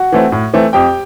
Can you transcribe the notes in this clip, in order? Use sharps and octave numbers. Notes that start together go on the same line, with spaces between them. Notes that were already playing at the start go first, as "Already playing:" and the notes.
Already playing: F#4 F#5
E3 A3 C4
A2
E3 A3 C4
F2 G4 G5